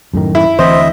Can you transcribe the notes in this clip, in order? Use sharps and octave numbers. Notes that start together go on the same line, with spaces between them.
F#2 A2 D#3
E4
D2 E3 C4 C5 D#5 E5